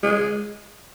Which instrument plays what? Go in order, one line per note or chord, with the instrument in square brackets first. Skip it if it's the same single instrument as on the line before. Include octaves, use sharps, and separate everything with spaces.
[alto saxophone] G#3